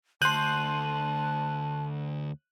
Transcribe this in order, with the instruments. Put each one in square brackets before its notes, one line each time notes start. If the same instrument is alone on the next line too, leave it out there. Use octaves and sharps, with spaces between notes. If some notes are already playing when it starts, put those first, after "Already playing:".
[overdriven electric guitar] D2 [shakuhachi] A5 [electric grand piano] C6 G6 [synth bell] F#6 D#7 F#7